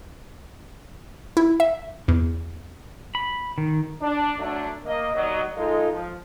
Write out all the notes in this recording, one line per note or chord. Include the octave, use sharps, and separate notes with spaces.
E4
E5
E2
B5
D#3
D4
F#3 A3 D4
A#3 D#5
D#2 F#3 D5 D#5
G#3 D#4 F4 A4
F3